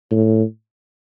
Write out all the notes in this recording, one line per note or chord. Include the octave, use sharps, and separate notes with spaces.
A2